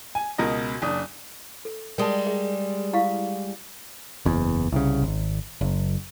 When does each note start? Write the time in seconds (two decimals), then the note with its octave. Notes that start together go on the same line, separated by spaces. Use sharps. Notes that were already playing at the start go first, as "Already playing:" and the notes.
0.15 G#5
0.38 C#2 B2 A#4 D#5
0.82 F#1 D4 D#6
1.65 A4
1.98 G3 G#3 A#4 A5
2.26 G#4 E5
2.93 E4 F5 C#6
4.25 F#1 E2
4.72 C2 C#3
5.03 G#1
5.61 F#1